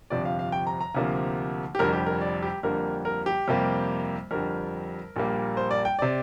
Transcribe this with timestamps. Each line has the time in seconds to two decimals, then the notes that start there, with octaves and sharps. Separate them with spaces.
0.10 G1 F2 C3 F3 D5
0.25 F5
0.39 F5
0.52 G5
0.67 A#5
0.81 A#5
0.95 D2 C3 F3 A#3
1.75 G4
1.79 F1 F2 D3 G3 A#4
1.93 G4
2.06 A#4
2.21 D5
2.43 G4
2.63 F2 D3 G3 A#3 A#4
3.05 A#4
3.26 G4
3.48 F2 C3 G3 A#3
4.31 F2 D3 G3 A#4
5.16 A#1 A#2 G3 A#3
5.57 C5
5.71 D5
5.85 G5
5.99 C3 D5